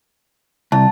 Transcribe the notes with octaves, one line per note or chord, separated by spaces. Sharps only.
C2 A5